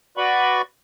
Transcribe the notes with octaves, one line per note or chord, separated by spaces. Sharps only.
F#4 B4 D5 B5 C#6